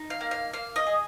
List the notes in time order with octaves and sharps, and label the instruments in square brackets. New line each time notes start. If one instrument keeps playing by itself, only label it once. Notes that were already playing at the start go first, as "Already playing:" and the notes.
Already playing: [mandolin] D#4
F5
A#3
F5
A#3 F5
D#5
G#4